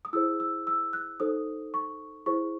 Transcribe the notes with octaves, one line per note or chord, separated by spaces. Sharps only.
D#6
E4 G#4 C5 E6
E6
E6
F#6
D#4 A4 C5 D#6
C#6
E4 G#4 C5 C#6